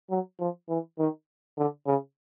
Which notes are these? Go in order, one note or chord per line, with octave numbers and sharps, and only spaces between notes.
F#3
F3
E3
D#3
D3
C#3